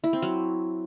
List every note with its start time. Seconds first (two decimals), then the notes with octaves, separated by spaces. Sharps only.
0.04 E4
0.13 C4
0.22 F#3